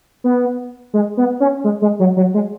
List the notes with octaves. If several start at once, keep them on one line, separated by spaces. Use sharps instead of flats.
B3
G#3
B3
C#4
G#3
G#3
F#3
F#3
G#3